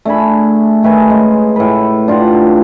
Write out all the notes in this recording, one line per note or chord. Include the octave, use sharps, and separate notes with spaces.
A3 D4 G#4 B5
D#3 A3 B4 G#5
C#3 G#3
A2 B4
D4 F4 G4 F#5